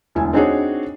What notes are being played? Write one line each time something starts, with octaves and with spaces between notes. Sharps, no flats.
E1 D2 E4 G#5
C4 D4 D#4 F#4 G#4 C#5